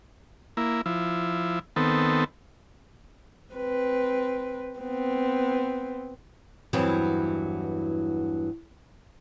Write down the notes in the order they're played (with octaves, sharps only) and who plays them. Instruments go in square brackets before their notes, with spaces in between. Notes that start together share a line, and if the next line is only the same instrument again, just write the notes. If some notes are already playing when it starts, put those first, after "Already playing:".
[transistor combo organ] A#3 E4
F3 E4
D#3 B3 C4 A4
[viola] C4 B4
B3 C4
[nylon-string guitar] E2 G2 E3 F#3 C4